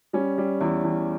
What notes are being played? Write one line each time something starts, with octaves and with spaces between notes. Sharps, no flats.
G3 C#4
G3
E2 E4
E2